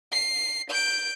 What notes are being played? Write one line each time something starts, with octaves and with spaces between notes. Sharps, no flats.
C7
G6 D7